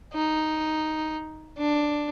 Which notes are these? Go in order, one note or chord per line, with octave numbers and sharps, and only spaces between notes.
D#4
D4